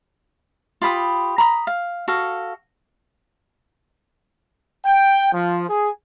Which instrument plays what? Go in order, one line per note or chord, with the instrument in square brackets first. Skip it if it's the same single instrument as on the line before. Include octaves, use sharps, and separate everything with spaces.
[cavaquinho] F4 G4 B5 D#6
A#5 B5 C#6 D#6
F5
F#4 A4 F5
[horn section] G5
F3
G#4